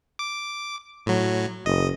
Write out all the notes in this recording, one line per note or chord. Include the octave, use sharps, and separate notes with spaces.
D6
A2 F#3
F#1 D#5